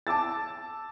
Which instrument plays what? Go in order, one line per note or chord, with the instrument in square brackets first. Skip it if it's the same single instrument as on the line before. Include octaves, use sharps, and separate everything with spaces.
[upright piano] A5 D6 E6 A6